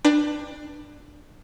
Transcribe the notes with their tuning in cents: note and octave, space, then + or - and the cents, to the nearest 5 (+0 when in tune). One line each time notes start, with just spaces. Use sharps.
D4 +20 B4 -10 G5 +30